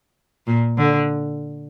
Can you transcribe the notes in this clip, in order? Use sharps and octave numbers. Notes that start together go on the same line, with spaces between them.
A#2
D3